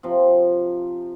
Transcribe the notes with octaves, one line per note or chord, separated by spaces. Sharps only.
C3 F3